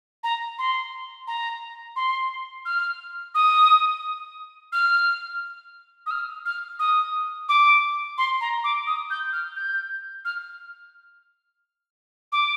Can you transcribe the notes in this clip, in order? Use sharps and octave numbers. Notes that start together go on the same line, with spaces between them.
A#5
C6
A#5
C6
F6
D#6
F6
D#6
F6
F6
D#6
D6
C6
A#5
D6
D#6
G6
F6
G6
F6
D6